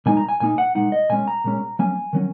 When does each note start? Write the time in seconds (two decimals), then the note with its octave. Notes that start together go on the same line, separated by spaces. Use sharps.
0.06 A#2 G#3 D#4 G#5
0.17 A#5
0.29 G#5
0.40 A#2 A#3 D#4 G#5
0.58 F#5
0.75 A#2 G#3 D#4 F#5
0.92 D#5
1.09 A#2 G#3 C#4 G#5
1.28 A#5
1.44 A#2 G#3 C#4
1.79 F#3 A#3 C#4 G#5
2.13 D#3 F#3 C#4